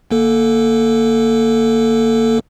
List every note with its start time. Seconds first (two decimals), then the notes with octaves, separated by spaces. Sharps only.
0.11 G1 A#3 A4